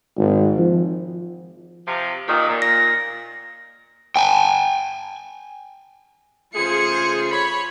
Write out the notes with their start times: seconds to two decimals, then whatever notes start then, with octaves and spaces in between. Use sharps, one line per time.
0.18 G#1
0.58 F3
1.87 C3 F3
2.28 A#2 D#3
2.49 A#2
2.62 A#6
4.16 G5 G#5
6.55 C#3 A3 F4 G#4 C5 C#7
7.31 C#5 B5